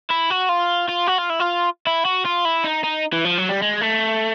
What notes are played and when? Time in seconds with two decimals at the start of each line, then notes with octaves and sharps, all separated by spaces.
0.10 E4
0.30 F#4
0.49 F4
0.89 F4
1.08 F#4
1.18 F4
1.30 E4
1.40 F4
1.87 E4
2.05 F#4
2.25 F4
2.45 E4
2.64 D#4
2.83 D#4
3.13 E3
3.25 F3
3.38 F#3
3.49 G3
3.62 G#3
3.81 A3